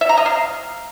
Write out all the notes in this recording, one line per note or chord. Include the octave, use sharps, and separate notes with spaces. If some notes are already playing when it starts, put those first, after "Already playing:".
E5
A#5
D#5
F5